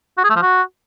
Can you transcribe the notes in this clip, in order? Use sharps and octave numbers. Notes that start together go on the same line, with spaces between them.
F#4
G#4
A3
F3
F#4